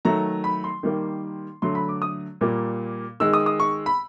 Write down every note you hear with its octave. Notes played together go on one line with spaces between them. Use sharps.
D#3 F#3 A3 A#5
B5
C6
D#3 G3 A#3
D3 F#3 A3 C6
B5
D6
D#6
A#2 G3 A#3
D#3 G#3 E6
D#6
D#6
C#6
B5